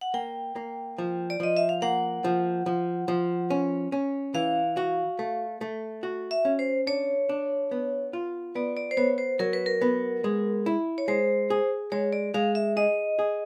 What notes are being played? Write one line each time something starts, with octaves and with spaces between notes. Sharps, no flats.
F#5
A#3 G5
A#3
F3
D5
F3 D#5
E5
F5
A#3 F#5
F3
F3
F3
C#4
C#4
E3 F5
F#4
A3
A3
F#4
E5
C#4
C5
D4 C#5
D4
B3
F4
B3 D5
D5
C5
B3 C#5
C5
F#3 A#4
B4
A#4
B3
G#3
E4
C#5
G#3 C5
G#4
G#3 C#5
D5
G#3 F5
E5
G#4 D#5
G#4